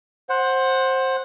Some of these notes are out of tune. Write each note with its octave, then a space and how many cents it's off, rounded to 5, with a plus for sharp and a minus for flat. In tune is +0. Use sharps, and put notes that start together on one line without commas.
C5 +15 F#5 +0